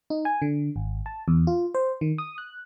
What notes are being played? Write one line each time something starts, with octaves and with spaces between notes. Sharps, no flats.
D#4
G#5
D3
G#1
A5
E2
F4
C5
D#3
D#6
F#6